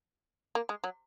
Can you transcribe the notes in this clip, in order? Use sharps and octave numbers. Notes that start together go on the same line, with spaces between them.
A#3
G#3
F#3